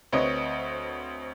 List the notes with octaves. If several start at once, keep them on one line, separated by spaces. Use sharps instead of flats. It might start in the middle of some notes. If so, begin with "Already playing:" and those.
D2 C4 B4 C#5 D#5 D#6